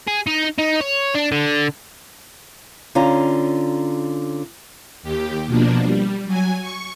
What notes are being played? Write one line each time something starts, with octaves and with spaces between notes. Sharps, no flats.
G#4
D#4
D#4
C#5
D4
D3
D3 C#4 F4 A#5
D#2 G4
B2 F3 A#3 D4
G3
F#3 G#5
C#6